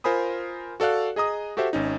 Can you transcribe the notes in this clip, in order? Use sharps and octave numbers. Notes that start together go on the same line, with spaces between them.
F4 A#4 C5 G#5 B5 D#6
F#4 A4 D5 F5 F#6
G#4 D#5 A#5 D#6
F#4 G4 A4 C5 E5 F#5
G#1 C#4 D#4